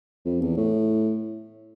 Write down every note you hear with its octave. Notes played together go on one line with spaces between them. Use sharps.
F2
E2
A2